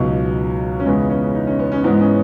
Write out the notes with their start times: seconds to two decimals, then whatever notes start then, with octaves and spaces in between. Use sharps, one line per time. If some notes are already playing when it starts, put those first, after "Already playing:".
Already playing: C#2 B2 F#3 D#4
0.80 C#4
0.85 E2 C#3 G#3 B3
1.10 C#4
1.35 D#4
1.47 C#4
1.59 B3
1.72 C#4
1.84 G#2 E3 G#3 B3
2.00 C#4